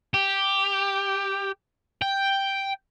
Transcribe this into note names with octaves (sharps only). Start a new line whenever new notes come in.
G4
G5